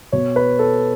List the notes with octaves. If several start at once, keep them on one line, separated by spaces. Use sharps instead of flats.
B2 C#5
B4
A4